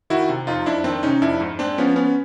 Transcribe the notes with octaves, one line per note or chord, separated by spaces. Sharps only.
D#3 E4 F#4
C3
F2 D#4 F4
F2 D4 E4
D#3 C4 D4
C3 C#4 D#4
F2 D4 E4
G#2
G#3 C4 D4
F3 B3 C#4
B3 C#4